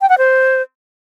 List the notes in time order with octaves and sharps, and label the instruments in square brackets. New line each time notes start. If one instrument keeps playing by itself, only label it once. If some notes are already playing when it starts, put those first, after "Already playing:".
[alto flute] G5
F#5
C5